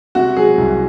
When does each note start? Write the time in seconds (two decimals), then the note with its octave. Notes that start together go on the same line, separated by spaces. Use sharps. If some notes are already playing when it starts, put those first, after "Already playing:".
0.15 C3 F#4
0.37 F#3 G#4
0.58 C2